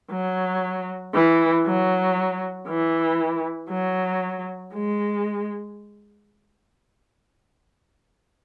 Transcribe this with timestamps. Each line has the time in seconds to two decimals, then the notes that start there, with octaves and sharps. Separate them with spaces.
0.11 F#3
1.14 E3
1.66 F#3
2.68 E3
3.70 F#3
4.73 G#3